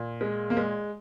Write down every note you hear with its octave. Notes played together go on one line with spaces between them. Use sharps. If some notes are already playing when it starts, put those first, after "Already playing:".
Already playing: A#2
G#3
A#3
G#3